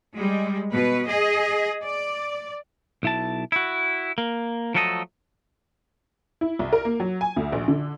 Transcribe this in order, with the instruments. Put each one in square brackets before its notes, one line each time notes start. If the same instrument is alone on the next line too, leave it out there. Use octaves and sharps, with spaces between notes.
[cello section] G3 G#3
B2 B4
G#4 D#5
D5
[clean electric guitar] B1 E4 A5
E4 F#4
A#3
F3 F#3 A3 A4 B4 D#5
[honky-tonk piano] E4
C2
A#4
A#3
F#3
G#5
D2
A#1
D3